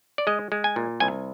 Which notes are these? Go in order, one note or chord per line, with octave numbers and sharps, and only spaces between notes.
D5
G#3 D#5
G#3
G#5
A#2
C2 G#5